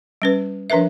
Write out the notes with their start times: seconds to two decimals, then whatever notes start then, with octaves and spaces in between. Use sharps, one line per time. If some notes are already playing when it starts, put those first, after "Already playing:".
0.22 G3 C#4 B4
0.70 F3 D4 A#4 B4 E5